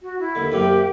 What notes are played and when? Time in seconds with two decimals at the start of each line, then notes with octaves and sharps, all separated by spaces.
0.02 F#4
0.20 E4
0.35 D#2 D3
0.52 F#2 C3 A#3 G4